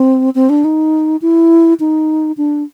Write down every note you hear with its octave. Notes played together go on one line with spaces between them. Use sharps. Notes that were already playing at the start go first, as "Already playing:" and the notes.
Already playing: C4
C4
D4
D#4
E4
D#4
D4